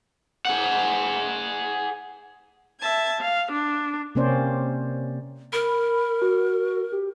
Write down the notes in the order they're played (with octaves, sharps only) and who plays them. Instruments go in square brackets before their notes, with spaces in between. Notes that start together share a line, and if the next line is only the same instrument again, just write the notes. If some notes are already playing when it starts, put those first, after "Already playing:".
[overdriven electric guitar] G#4 F#5
[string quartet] E5 A5 G#6
F5
D4
[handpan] C3 A#3 C4 C#4 C5 D5
[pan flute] A#4 [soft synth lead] B5
[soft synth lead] F#4
G4